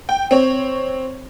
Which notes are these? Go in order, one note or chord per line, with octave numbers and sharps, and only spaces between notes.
G5
C4 C#5